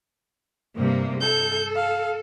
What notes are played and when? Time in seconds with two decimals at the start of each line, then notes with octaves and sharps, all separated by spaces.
0.75 G2 C3 A#3
1.21 A4 G6
1.76 F5